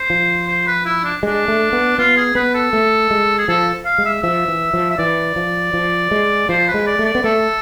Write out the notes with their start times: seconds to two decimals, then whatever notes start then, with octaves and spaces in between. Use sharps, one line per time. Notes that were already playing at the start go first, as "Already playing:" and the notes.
Already playing: C5
0.10 F3
0.48 C5
0.67 B4
0.86 E4
1.04 D4
1.23 G#3 D4
1.48 A3
1.73 B3
1.98 B3 F4
2.17 G#4
2.35 B3 B4
2.54 A4
2.73 A3
3.11 G#3
3.38 G#4
3.48 F3 A4
3.85 F5
3.98 G#3
4.05 E5
4.23 F3 E5
4.48 E3
4.74 F3
4.90 E5
4.98 E3 D5
5.36 F3
5.74 F3
6.11 G#3
6.49 F3 C5
6.68 B4
6.74 G#3
6.87 D5
6.99 A3
7.05 D5
7.15 B3
7.24 A3 A4